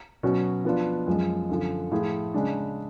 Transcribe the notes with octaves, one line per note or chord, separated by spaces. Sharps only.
B2 F#3 C#4 F#4
F3 B3 D4 F4
F#2 F3 G#3
F#2 D3 F3
A2 F3 A3 F4 G#4
C#3 G#3 D4